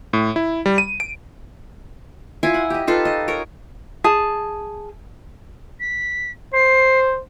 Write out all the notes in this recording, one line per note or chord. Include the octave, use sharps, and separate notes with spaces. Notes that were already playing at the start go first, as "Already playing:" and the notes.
A2
E4
G3
D#7
D7
E4 F4 G#5
F#5
G4 D#5
D#4 F4 A4 B4
D#5
A#4 C#5 A#5
G#4 A5
B6
C5 C7